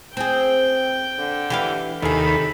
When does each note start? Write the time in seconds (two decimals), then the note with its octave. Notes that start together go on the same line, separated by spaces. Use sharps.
0.17 C4 G#4 G5
1.19 D3
1.50 E3 G4 F5
2.02 D#2 C3 G#4 A4 B5